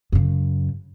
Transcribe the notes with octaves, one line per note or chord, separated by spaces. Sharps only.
F#2 C#3